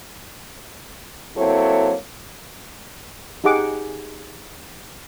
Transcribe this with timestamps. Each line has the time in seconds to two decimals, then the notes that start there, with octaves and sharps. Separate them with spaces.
1.37 F#3 A#3 C4 E4 A4 C#5
3.44 D#4 G4 G#4 F#5 D6